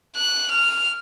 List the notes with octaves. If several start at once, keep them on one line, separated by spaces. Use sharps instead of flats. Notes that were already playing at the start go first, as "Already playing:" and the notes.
F#6
F6